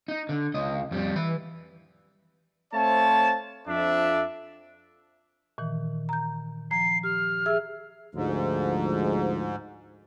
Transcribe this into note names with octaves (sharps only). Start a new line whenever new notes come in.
D#4
D3
C#2 D#5
F2 G3
E3 B5
A3 C4 C5 C#5 F5 A5
F2 D4 E5
A#2 D#3 E3
A#5 G6
F3 A#5 C7
G4 F6
G#4 E5 E6
D2 G#2 F3